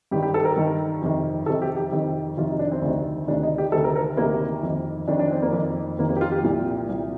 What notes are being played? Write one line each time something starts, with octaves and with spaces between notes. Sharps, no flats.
G2 D#3 G4
G4
A4
A#4
G2 D#3
F2 C3 D#3
F2 C3 D#3 A4
G4
G4
F2 C3 D#3
F2 C3 D#3 F4
D#4
D4
C4
D2 C3 D#3
D2 C3 D#3 D4
D#4
G4
D2 C3 D#3 A4
A#4
A#4
D2 C3 D#3 A#3
F2
D#3
F2 D#3 D4
D4
C4
A#3
F2 D#3
F2 D#3 A#3
A#3
G4
F4
G4
C2 A#2
C2 A#2